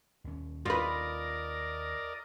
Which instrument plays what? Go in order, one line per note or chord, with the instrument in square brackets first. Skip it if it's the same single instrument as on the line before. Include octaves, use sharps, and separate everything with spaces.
[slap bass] D#2 C#4
[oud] F4 B4 [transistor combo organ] A#4 D5 D#5